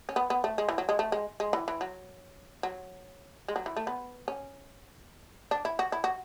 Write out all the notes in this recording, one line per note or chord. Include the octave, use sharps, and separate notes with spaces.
C#4
B3
B3
A3
G#3
E3
F#3
G#3
A3
G#3
G#3
E3
E3
F#3
F#3
G#3
F#3
E3
A3
B3
C#4
D4
E4
F#4
E4
F#4